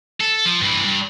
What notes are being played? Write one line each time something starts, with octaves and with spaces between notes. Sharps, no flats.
A4
F3
G2 E3
G2